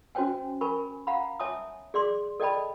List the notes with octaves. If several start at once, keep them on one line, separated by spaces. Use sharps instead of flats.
C#4 F#4 C5 C#5 G5 G#5
A#4 G#5 B5 C#6
F5 F#5 A#5 B5
C#5 E5 G#5 A5 D6 D#6
G#4 D5 C6 D6
A4 D5 D#5 G5 A5 B5